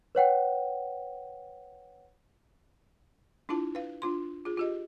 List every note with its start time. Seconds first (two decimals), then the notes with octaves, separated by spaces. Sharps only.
0.15 B4 C#5 F#5 G5
3.49 D4 E4 F4 A5
3.75 B4 F5
4.02 D4 F4 C6
4.45 F4 G#4
4.58 F4 G4 D#5